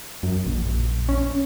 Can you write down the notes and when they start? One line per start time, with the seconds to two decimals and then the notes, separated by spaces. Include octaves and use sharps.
0.23 F#2
0.47 A#1
1.09 C#4